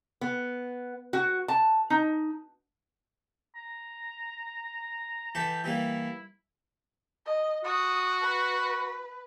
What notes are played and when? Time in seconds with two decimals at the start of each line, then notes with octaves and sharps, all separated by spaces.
0.21 B3
1.13 F#4
1.48 A5
1.90 D#4
3.55 A#5
5.35 E3 G4 A4 E5
5.64 E3 G3 A#3 E4
7.26 D#5
7.64 F#4 D#6
8.21 B4